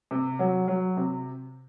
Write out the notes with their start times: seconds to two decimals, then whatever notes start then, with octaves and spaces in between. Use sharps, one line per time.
0.11 C3
0.39 F#3
0.68 F#3
0.97 C3